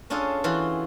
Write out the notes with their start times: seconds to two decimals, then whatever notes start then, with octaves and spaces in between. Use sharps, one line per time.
0.10 C#4 D4 F4 G#4 A4
0.44 E3 F4 F#4